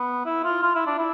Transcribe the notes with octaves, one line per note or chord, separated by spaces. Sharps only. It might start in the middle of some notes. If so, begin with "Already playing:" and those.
Already playing: B3
E4
F4
F4
E4
D4
E4